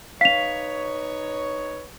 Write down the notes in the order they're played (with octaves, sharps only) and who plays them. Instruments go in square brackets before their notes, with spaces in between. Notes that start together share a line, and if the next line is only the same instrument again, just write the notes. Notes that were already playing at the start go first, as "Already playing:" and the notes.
[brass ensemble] D#4 B4 C#5 [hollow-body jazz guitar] F5 [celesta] B6 F7